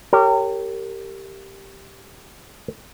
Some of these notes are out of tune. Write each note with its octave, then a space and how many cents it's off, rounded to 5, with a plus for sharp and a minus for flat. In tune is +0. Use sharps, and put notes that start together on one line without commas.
G4 -5 A#4 -30 C#5 +0